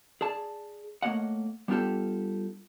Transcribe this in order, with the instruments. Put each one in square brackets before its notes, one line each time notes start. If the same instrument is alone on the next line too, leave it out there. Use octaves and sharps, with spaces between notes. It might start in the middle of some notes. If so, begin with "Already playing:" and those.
[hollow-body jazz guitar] G#4 D5 A5
A3 A#3 C4 C#5 D#5 F#5
G3 B3 D4 F4 G4 A4